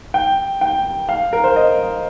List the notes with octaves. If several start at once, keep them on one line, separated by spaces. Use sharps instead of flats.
G5
G5
F5
A#4
C5
D#5